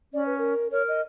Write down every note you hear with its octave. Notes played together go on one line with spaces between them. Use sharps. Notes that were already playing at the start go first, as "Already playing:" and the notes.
C#4 D5
B4
A#4
A#4 C#5
D#5